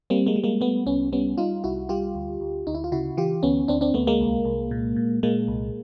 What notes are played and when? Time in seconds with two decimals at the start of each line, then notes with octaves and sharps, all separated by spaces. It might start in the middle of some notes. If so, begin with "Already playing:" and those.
0.10 G3 A#3 C4
0.26 G#3 A#3
0.36 G3
0.44 G#3 A#3
0.61 G3 A3 B3
0.86 C2 B3 C#4
1.12 G3 B3 C#4
1.38 G3 D#4 F4
1.64 C2 E4 F#4
1.89 G3 F4 G4
2.15 D2
2.41 D2
2.67 D2 D#4
2.75 E4
2.84 F4
2.92 C#3 E4 F#4
3.17 E3 F4 G4
3.43 D2 B3 C#4
3.68 D2 C4 D4
3.81 C4 D4
3.94 D2 A3 B3
4.07 G#3 A#3
4.21 C2
4.45 C2
4.71 A#2
4.96 A#2
5.23 A#2 G#3 A#3
5.48 C2